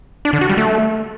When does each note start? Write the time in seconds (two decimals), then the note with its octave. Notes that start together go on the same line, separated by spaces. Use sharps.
0.25 D4
0.33 D3
0.41 F#4
0.49 G3
0.58 A3